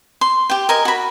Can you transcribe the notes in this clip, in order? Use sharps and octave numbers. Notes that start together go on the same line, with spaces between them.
C6
G4 G5
A#4 D#5 G#5
F#4 B5